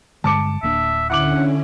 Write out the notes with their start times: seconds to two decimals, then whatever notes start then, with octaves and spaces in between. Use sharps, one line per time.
0.24 G2 D3 G#3 A5 D6 C#7
0.63 D1 A#3 D4 E5
1.10 D3 C#4 E4 F#5 D6 F#7